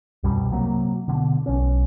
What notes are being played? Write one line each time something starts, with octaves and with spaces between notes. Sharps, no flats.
C2 F#2 B2 G3
C3 F#3 A#3
B2 D3
B1 C#4